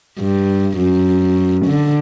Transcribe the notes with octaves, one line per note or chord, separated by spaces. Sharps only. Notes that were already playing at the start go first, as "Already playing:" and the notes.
G2
F#2
D3